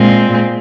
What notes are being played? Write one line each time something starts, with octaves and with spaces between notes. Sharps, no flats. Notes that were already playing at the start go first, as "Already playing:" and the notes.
Already playing: A#2 G#3 C4